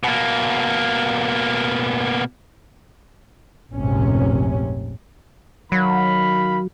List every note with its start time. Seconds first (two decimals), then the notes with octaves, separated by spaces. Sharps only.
0.04 B2 A#3
3.72 F1 A#1 G#2 C3 C#4
5.72 D#3 F#3 F5 B5